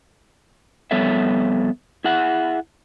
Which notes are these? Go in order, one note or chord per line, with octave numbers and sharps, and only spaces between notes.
F2 G3 B3 A4 C#5 E5
E4 G#4 E5 F#5